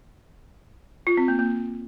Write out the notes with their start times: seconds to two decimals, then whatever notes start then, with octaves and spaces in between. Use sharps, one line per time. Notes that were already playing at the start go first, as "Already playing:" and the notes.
1.07 F4
1.17 C4
1.28 A#3
1.39 A#3